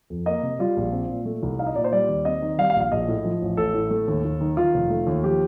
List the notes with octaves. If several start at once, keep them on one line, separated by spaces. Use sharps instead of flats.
F2
A#3 D#5
C3
G3 F4
A#1
C4
A#2
A3
C2
D#4 F5
D#5
A#2 D5
C5
G3 D5
D#2
C4 D#5
D#3
G3 F5
F5
A#1
F5
A#1 D#5
A2
F3
A1
A1 A4
A2
A3
D#2
D#2
D#3
D#3 F4
F1
A3
D#2
F3 G4